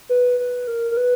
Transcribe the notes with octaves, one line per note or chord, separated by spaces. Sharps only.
B4
B4
A#4
A#4
B4